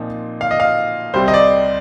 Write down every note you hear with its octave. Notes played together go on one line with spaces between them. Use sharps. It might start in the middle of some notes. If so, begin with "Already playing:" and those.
Already playing: A#2 F3 C4 D#4
F5
D#5
F5
C2 C3 G3 C4 C5
D#5
D5